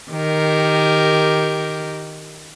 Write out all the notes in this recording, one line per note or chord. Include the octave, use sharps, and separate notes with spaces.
D#3 G4 A#4